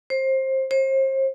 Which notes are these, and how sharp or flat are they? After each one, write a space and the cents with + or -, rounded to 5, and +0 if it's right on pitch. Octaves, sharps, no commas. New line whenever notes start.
C5 +20
C5 +35